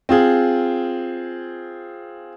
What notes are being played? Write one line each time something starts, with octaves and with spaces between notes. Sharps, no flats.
C4 F4 G#4